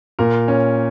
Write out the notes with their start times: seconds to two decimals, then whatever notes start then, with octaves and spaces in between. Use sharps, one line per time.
0.19 A#2 A#4
0.48 C#4